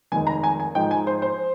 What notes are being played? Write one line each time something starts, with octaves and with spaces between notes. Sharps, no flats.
F1 D#2 D#3 G#3 D#4 G#5
A#5
G#5
G#5
G#2 F3 G#3 D#4 G5
G#5
C5
C5